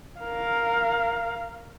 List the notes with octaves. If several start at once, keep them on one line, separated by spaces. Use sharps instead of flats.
A#4 F5